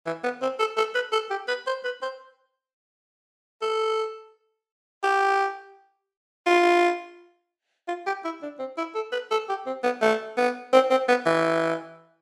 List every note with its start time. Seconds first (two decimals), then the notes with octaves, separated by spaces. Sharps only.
0.06 E3
0.23 B3
0.42 C4
0.59 A4
0.77 A4
0.95 B4
1.12 A4
1.30 G4
1.48 B4
1.67 C5
1.84 B4
2.02 C5
3.62 A4
5.03 G4
6.46 F4
7.88 F4
8.06 G4
8.25 E4
8.42 D4
8.59 C4
8.78 E4
8.95 A4
9.12 B4
9.31 A4
9.49 G4
9.66 C4
9.83 B3
10.02 A3
10.37 B3
10.73 C4
10.90 C4
11.08 B3
11.26 E3